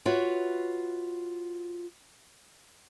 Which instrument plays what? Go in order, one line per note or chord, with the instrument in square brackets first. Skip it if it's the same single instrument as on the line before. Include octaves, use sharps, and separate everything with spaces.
[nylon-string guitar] F4 F#4 B4 C#5 E5